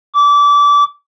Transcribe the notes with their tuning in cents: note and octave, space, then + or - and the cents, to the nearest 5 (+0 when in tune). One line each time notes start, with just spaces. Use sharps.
D6 -25